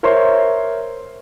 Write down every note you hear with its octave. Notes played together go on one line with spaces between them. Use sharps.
A#4 C5 C#5 E5 C6